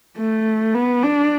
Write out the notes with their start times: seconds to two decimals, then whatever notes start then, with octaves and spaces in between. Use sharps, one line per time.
0.17 A3
0.74 B3
1.03 D4